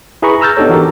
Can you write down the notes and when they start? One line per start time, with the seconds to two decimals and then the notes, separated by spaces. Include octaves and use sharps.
0.22 E4 G#4 B4 A#5 B5 C#6
0.41 A#5 E6 F6 G6 A6
0.57 B3 D4 D#4 G4 A4 C#5
0.69 E3 F#4 G4 A4 A#4